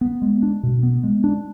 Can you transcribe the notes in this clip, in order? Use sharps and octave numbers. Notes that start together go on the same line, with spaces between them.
B3
G#3
D4
B2
B3
G#3
D4